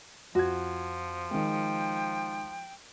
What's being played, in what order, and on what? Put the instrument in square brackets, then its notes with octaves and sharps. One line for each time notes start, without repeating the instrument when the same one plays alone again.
[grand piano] F2 G#6 [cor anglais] F3 [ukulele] F#4
[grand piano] D#3 G#3 [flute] G5